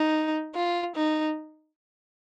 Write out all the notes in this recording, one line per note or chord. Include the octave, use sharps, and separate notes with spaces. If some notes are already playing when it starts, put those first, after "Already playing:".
Already playing: D#4
F4
D#4